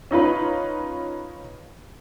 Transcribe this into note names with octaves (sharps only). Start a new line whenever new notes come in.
C#4 D#4 F4 B4